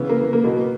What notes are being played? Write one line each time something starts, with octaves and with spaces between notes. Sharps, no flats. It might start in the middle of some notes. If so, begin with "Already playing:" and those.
Already playing: C#3 E3 B3
A#3
A#3
B2 F#3 B3